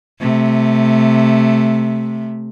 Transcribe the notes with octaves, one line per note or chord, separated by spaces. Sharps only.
C3 A3